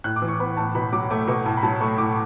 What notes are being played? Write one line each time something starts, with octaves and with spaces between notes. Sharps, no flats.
A2 F#6
D6
E3
C#6
B3 B5
A2 A5
B2 B5
F#3 D6
A3 D6
B2 C#6
A2 A5
B5
F#3 A5
A3 C#6
A2 D6